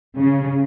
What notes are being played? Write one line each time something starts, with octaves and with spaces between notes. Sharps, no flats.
C#3